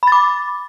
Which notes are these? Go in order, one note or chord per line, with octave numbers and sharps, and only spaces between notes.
B5 D6 A6